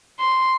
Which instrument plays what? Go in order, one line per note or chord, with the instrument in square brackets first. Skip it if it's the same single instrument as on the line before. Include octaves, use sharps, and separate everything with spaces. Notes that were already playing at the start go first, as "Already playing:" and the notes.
[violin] C6